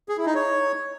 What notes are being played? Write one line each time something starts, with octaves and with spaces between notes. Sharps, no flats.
G#4
E4
D#4
C#5